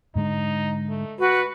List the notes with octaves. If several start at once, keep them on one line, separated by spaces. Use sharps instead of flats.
G#2 D3 G#3 D#4
A3
F#4 B4